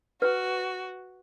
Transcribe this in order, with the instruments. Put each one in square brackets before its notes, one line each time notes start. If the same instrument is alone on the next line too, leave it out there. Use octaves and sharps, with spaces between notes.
[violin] F#4 [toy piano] B4